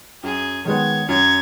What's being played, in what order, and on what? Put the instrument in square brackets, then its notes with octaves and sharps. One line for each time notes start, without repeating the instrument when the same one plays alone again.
[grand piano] F#2 [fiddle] G#4
[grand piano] D#3 G#3 B3 [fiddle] C#5
[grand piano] F#2 [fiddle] C#5